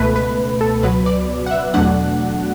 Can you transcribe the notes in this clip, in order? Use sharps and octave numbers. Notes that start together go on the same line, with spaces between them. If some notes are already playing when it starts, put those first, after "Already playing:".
Already playing: C#2 B2 A3 B4
B4
A4
C#2 B2 F#3 B4
D5
F#5
E5
E2 B2 F#3 A3 D4 F#5